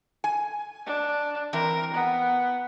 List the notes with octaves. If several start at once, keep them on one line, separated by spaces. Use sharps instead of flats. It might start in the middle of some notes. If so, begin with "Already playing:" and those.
G#5
D4
E3 C4 A#4
B3